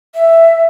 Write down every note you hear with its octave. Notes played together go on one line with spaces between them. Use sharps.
E5